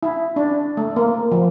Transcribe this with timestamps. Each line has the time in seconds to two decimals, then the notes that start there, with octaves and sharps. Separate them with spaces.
0.03 E4
0.36 D4
0.77 A3
0.96 A#3
1.32 F3